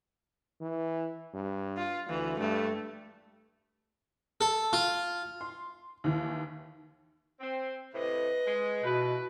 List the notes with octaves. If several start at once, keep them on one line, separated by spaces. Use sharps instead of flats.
E3
G2
F4
D2 E3
G2 A3
A4
F4
C6
D#2 D#3 E3
C4
A2 C3 B4 D#5
G#3
B2 F3 E4 B4